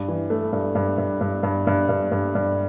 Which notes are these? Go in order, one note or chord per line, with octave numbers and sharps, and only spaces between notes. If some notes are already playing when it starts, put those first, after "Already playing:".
Already playing: G2
E3
A3
G2
G2
G2
G2
G2
G2
G2
G2
G2